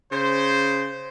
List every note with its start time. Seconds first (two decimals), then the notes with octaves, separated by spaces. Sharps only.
0.12 C#3 C5